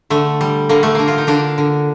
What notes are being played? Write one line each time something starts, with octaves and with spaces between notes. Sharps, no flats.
D3 A3
G3
D3 A#3
A3
D3 A#3
F4
D#4
D3 A#3 D4
D3